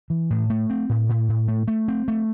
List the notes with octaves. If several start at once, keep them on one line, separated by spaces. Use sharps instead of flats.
E3
A2
A3
C4
A2
A2
A2
A3
A3
C4
A3